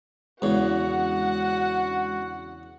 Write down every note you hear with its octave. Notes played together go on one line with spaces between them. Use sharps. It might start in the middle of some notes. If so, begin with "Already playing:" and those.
E2 C#3 G#3 C#4 D4 F#4 F#5